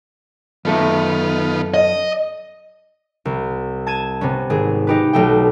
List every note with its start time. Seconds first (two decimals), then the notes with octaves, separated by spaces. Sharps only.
0.65 F#2 D#3 B3 F4 A4 E5
1.74 D#5
3.25 C2
3.86 A5 G#6 D#7 E7
4.21 C3 B3 C#4
4.50 G#1 G#4
4.87 D#4 G4 B4
5.13 B1 A3 G5